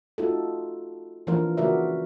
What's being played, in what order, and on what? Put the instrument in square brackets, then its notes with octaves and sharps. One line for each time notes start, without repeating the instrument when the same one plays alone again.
[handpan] D#4 F4 F#4 A4
E3 F3 A#3 D4 F4 A#4
C#3 A#3 F#4 A#4 D5 E5